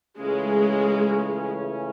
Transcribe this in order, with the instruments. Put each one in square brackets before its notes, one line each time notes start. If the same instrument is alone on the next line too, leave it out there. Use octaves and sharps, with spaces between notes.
[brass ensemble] C#2 C#3 E3 A3 C#4 [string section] G#3